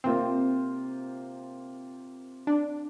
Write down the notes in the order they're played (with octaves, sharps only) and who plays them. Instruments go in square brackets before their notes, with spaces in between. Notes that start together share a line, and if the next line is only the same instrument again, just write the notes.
[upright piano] C3 A#3 F4 C5 [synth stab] C4
[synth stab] D4